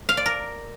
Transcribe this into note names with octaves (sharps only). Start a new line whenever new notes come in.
F5
D5
A#4